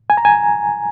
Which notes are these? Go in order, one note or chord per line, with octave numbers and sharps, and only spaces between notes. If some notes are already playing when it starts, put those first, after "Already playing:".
G#5
A#5
G#5